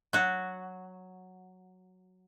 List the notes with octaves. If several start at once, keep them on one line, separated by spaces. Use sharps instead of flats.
F#3 F#4